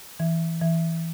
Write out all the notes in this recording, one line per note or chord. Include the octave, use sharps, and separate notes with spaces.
E3
E3